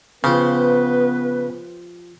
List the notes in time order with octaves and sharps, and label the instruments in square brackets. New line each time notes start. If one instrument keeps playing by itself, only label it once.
[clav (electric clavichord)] C#3 [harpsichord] F3 G4 C5 [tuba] B3 [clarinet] B4